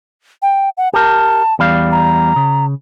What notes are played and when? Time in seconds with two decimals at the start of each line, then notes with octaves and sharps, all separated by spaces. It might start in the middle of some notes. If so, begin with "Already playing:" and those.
0.42 G5
0.77 F#5
0.94 G4 A#4 A5
1.59 E2 G3 F5
1.92 A#5
2.36 C#3